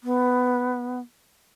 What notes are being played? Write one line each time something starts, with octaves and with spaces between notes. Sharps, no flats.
B3